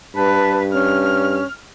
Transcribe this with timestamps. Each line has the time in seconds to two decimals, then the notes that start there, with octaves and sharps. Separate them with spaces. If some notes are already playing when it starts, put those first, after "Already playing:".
0.16 G2 B4 A5
0.73 C#4 F6